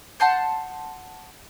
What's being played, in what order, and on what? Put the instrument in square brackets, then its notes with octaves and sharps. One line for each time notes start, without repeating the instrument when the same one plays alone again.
[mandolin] F#5 A5 C6 G6